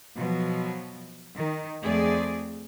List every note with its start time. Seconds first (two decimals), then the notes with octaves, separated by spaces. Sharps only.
0.16 B2 F3 F#3
1.35 D#3
1.83 F2 A3 C4 G#4 D5